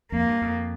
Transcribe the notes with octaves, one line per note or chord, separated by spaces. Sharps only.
F2 A#3
G2
F2